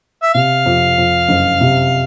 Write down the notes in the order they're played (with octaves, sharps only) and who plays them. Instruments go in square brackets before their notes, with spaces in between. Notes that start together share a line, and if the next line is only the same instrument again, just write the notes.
[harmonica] E5
[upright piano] C3 [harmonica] F5
[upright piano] F2
F2
F#1
C3